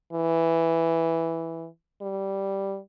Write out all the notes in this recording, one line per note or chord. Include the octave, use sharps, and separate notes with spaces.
E3
G3